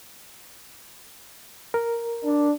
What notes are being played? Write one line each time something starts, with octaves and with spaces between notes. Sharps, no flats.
A#4
D4